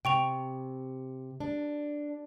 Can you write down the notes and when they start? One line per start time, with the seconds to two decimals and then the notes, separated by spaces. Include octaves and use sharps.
0.05 C3 G5 C#6 F7
1.40 D4